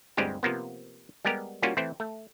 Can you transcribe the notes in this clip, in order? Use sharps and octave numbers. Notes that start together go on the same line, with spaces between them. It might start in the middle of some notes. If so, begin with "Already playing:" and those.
G1 D2 G3 G#3 C4 G4
C3 F3 A#3 B3
G3 G#3 B3 G4 A#4
G3 A#3 C#4 F4 F#4
E3 A3 C4 E4 C5
A3